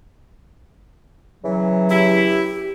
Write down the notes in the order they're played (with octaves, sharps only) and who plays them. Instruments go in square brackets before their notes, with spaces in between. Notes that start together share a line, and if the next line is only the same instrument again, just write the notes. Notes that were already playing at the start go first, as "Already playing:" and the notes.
[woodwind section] C#3 E3 F#3
[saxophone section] E4 [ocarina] G4